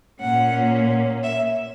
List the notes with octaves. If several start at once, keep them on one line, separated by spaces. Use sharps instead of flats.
A#2 A#3 C#4 F#5
E5